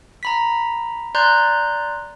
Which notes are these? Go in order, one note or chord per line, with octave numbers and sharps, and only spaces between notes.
A#5 B5 B6
D5 A#5 C6 F#6 G6